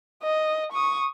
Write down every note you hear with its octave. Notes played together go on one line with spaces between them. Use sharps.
D#5
C#6 D#6